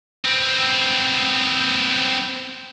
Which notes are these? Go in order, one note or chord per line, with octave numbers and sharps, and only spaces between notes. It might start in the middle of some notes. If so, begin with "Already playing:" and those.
B3 C4